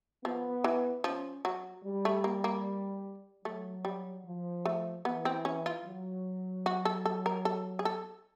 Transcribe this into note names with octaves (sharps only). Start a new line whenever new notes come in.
F3 B3
E3
F3 C#4
F#3
G3
A3
A#3
A#3
F#3 A3
G3
F3
A3
E3 B3
C4
C#4
F4
F#3
F#4
A4
A4
A#4
A4
G#4
A4